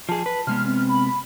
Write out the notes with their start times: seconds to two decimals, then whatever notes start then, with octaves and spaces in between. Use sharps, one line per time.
0.09 F3 G#4 A5
0.26 B4
0.47 C3 G#3 B3 F6
0.66 C4
0.89 B5